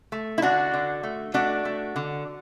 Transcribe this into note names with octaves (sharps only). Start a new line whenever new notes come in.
A3
E4
D3 D4 F#4
D3
A3
A3 D4 F#4
A3
D3